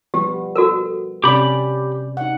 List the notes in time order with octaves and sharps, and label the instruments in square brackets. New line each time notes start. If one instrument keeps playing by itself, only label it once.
[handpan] F3 G3 B3 [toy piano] G4
[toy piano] F#4 A4 A#4
[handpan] C3 C#4 D5 [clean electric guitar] G4 B5
[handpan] D#4 F#5